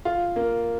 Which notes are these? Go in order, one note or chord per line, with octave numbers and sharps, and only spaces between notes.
F4
A#3